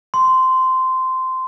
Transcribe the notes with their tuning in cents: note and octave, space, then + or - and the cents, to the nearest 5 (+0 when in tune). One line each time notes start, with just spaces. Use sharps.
C6 -15